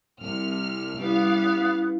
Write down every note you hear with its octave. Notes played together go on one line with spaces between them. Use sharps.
C2 F6
G3 B3 C#4 E4 B4 F5